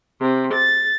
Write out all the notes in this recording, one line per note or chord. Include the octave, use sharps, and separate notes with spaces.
C3
A6